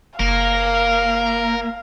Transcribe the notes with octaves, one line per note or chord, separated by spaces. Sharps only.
F#1 A#3 A#4 F5